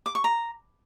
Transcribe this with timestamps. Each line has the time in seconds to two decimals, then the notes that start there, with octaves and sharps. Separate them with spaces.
0.06 D6
0.15 C#6
0.24 A#5